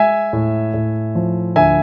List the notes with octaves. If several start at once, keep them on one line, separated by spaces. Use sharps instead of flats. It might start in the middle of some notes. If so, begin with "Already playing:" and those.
Already playing: G#3 E5 G#5
A2
A2
F3
D2 E5 G#5